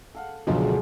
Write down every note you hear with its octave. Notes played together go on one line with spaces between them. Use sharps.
A4 F5 F#5
C#2 B2 D3 F3 F#3 G#3 A4